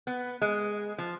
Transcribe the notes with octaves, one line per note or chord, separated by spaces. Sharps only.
B3
G#3
F3